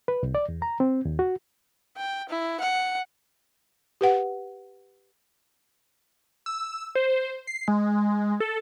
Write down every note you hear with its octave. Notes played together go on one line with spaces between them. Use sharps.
B4
C2
D5
E2
A#5
C4
D#2
F#4
G5
E4
F#5
G4 B4 F#5
E6
C5
C7
G#3
A4